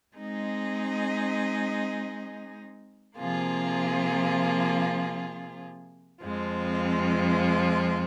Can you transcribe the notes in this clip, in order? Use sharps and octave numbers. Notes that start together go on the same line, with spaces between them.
G#3 C4 D#4 G#4 D#5
C3 F3 A#3 F4 G#4
F2 F3 G#3 C4 F4